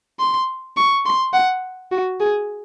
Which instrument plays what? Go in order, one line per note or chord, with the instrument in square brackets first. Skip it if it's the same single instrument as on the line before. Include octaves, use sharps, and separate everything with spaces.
[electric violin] C6
C#6
C6
F#5
F#4
G#4